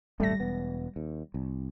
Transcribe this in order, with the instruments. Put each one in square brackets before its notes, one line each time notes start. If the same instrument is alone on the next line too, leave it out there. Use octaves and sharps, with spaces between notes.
[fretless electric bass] D#1 G#1 A3 [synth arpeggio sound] G3 A#6
[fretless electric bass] E1 B3
D#2
C2